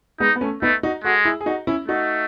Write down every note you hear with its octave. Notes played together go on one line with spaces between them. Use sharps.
G#3 B3 D#4
B3
A3 C#4
A3 B3 D#4
D#4 F#4
G#3 F#4 A4
E4 G#4
G#4
D#4 F#4
C#4 E4
A3 D#4 F#4